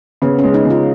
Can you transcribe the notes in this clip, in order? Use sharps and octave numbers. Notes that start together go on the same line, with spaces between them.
C#3 B3
C#4
G#3
D#4
C#3
F4